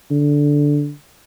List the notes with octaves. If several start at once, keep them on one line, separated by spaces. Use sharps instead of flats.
D3